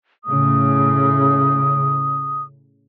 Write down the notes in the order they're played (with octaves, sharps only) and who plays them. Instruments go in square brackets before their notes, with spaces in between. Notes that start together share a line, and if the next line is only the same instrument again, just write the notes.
[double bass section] A2 C#3 [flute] D#6